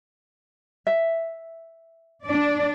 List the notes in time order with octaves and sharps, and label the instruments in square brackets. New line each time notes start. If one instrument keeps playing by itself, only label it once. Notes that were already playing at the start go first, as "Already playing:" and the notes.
[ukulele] E5
[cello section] D4 D5